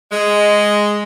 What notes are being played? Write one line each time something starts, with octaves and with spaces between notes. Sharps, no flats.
G#3